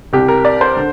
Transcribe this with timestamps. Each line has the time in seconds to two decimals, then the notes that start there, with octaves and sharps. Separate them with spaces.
0.13 C2 C3 G4
0.28 A#4
0.45 D5
0.61 C5
0.76 D3